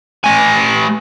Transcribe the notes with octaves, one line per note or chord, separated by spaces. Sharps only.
A3 G#5